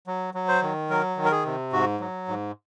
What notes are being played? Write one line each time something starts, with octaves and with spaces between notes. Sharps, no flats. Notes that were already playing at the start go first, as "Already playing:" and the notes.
F#3
F#3
C5
D#3
F#3 A#4
D#3
A#4
G#4
C3
G#2 F#4
F#3
G#2